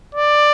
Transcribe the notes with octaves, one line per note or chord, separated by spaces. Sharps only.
D5